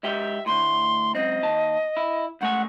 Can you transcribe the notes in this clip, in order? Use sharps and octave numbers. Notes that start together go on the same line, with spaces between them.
G#2 G4 E5 G5
D2 A2 C6
C#2 F#2 C4 D#5
D#2 D#3 A5
E4
C#2 A3 F#5 G#5